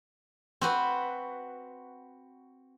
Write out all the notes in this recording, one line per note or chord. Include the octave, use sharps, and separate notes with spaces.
C4 F#4 B4